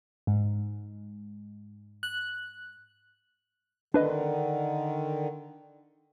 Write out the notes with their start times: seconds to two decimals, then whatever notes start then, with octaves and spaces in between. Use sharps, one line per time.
0.27 G#2
2.03 F#6
3.94 D3 D#3 D4 B4 D#5